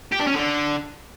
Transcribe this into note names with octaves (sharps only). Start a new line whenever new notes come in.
G4
D4
C#4
D3